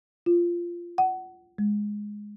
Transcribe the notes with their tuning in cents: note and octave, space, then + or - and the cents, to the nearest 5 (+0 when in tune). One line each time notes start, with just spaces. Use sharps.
F4 -10
F#5 +20
G#3 +0